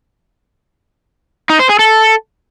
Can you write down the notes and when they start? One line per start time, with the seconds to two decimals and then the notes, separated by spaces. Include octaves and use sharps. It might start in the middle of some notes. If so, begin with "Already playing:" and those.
1.50 D#4
1.59 C5
1.69 G#4
1.79 A4